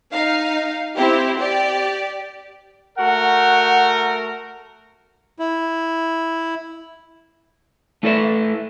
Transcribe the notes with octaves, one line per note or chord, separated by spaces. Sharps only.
D#4 F5
C4 E4 G4
G4 D5
A3 F#4 A#4 F#5
E4
A3 E4 A4 B4 D5 E5